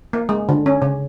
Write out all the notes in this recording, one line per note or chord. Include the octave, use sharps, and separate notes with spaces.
A#3
G#3
D3
C#4
C#3